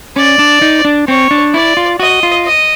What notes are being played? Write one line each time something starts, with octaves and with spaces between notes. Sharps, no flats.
C#4 D5
D4
D#4
D4
C4 C#5
D4
E4 D5
F4
F#4 D#5
F4
D#5